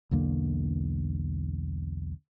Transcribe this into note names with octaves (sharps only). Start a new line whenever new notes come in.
B1 E2 D3 A#3